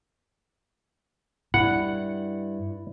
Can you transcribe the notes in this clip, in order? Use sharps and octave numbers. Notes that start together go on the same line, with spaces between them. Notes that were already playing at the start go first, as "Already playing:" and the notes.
G2 E4 F#5